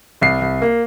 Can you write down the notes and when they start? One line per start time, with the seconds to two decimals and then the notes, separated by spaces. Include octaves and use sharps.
0.21 C2 C7
0.41 C2
0.62 A#3